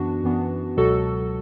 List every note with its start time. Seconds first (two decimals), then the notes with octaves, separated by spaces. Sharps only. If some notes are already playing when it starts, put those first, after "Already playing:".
Already playing: F#2 E3 B3 D4 F#4
0.23 F#2 E3 B3 D4
0.77 C#2 B2 F#3 F#4 A4